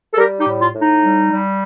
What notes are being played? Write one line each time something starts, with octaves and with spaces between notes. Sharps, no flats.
A4
G3 G4 A#4
D#4 G4
A2
F4
A2
D#4
G3
G3